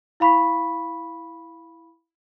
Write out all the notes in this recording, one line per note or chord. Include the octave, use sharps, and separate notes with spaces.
E4 F5 B5 C#6 B6